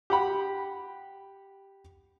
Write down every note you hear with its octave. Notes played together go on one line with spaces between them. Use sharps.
G4 F#5 B5